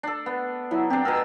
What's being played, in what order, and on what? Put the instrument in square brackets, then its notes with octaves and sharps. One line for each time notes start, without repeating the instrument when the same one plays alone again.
[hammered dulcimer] D4 A4
B3
[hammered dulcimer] F#3 [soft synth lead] E4
[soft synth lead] C4 [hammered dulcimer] D4 G4
[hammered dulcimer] B2 G#4 A#4 [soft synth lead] E6